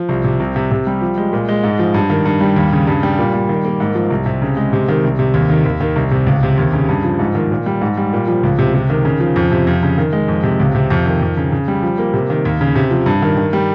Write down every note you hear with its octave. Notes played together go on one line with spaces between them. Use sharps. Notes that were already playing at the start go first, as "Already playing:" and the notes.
Already playing: F3
C2
C3
C2
C3
C3
G3
F3
G#3
A#2
G#3
G#2
F3
G2
D#3
G2
G3
D#2
C#3
G2
G3
A#2
G3
D#3
A#3
G#2
F3
C2
C3
C#3
G#3
C3
D#3
C2
C3
D#2
D#3
D#2
D#3
C2
C3
C#2
C3
D#2
C#3
G2
F3
G#2
D#3
A#2
G3
G#2
G3
A#2
F3
C#2
C3
C3
D#3
C#3
F3
F2
C3
F2
C#3
D#3
G#3
F2
C3
C#2
C3
F2
D#3
F2
C#3
C#3
G3
F3
A#3
C3
D#3
D#2
C#3
C3
F3
G2
D#3
D#3
G3